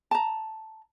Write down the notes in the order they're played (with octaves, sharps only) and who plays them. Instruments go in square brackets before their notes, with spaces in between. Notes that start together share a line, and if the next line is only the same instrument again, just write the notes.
[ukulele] A5 A#5